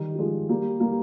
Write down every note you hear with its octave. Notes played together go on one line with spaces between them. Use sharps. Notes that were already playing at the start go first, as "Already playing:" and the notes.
Already playing: D#3 G3
G3
F3 G#3
G3 A#3
G3 A#3